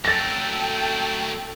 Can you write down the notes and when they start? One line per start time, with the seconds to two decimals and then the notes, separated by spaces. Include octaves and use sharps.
0.05 F#3 A3 A4 G5 A6 A#6